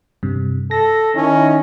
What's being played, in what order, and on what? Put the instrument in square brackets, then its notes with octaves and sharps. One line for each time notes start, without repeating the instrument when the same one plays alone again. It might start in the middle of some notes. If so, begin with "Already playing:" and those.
[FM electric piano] G2 C3
[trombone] A4 [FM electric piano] A#6
[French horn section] D#3 D#4 E4 [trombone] C#4